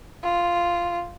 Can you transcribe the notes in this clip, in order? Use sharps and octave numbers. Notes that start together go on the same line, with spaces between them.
F4